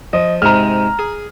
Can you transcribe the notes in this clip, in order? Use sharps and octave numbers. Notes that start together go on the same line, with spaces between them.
F3 D#5
G#2 C3 G#3 A#5 F6
G#4